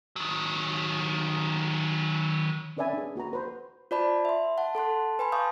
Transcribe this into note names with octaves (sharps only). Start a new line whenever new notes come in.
D#3 F#3
C4 C#4 B4 D5 E5 G#5
D4 G#4
A#3 F#4 B4 A#5
B4 C5 F#5
F4 C5 D5 A5 B5
E5 C6
F#5 A5
A4 A5 C6 F#6
B4 G#5 B5 C6
F5 A5 C#6 D#6 G6